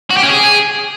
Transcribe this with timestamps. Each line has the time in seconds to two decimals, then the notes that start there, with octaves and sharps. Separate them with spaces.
0.11 F#4
0.17 G4
0.23 C#4
0.29 G#4